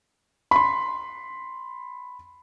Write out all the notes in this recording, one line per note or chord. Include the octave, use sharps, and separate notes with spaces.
B5 C6